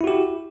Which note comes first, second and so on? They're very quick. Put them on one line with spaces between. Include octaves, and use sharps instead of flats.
E4 F#4 G4